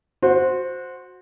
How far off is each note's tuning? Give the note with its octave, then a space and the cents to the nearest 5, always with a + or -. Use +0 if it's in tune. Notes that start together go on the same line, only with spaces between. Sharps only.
F#4 -20 C5 +0